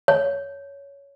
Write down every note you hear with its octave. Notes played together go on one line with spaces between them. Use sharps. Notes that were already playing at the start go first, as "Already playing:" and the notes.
C#5